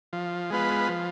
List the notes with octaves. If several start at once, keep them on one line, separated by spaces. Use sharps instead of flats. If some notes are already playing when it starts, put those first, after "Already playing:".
F3
G#3 B3 F4 B4
F3